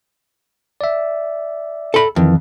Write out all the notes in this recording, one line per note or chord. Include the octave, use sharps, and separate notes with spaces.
D5 E5
A4 B5
F2 D#3 E3